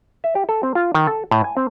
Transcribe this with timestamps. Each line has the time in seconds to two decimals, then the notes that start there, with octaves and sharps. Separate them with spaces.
0.24 E5
0.35 G4
0.49 A4
0.63 C4
0.75 F4
0.94 D#3
1.07 A4
1.31 A2
1.44 G#5
1.57 C4